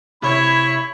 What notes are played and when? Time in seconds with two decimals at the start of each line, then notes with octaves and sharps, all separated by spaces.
0.23 C3 E4 C#5 E5 B5